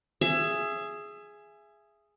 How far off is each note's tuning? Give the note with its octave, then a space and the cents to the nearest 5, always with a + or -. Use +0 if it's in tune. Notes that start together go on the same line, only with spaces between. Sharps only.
G#4 +0 E5 +25